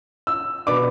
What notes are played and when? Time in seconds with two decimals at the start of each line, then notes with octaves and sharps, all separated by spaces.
0.27 E6
0.67 B2 B3 D4 D6